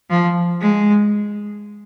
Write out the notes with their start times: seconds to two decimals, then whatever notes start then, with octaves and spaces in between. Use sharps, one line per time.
0.10 F3
0.61 G#3